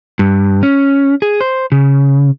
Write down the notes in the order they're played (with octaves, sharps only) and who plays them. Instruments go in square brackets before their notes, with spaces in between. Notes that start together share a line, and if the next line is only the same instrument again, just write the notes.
[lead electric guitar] G2
C#4
G#4
C5
C#3